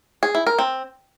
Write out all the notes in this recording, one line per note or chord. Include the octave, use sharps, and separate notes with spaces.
G#4
E4
A#4
C4